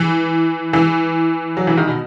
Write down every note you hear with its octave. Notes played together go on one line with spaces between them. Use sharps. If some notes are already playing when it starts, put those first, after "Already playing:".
Already playing: E3
E3
F#3
E3
D#3
B2